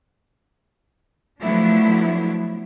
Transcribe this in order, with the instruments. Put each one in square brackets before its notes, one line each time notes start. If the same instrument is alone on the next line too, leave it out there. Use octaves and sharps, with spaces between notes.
[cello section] F3 F#3 A3 B3 D4 E4